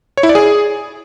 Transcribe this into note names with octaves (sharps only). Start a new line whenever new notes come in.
C#5
E4
D5
G#4